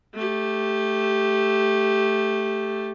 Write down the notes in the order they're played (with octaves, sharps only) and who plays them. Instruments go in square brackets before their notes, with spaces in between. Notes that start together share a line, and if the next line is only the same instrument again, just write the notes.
[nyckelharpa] A3 G4